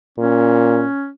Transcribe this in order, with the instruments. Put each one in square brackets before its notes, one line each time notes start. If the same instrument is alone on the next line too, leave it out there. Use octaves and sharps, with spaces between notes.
[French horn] A#2 [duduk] C#4